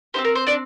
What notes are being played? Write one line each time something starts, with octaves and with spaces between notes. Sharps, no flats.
C4 D#4 G4 C5
A#4
C5
D4 D5